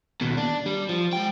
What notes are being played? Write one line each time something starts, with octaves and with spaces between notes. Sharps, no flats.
D#2 B2
D4
G3
F3
G#3 G5